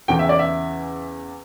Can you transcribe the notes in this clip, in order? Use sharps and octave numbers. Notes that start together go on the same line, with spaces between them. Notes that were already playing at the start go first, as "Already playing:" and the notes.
E2 C#3 E3 G5
E5
D5
E5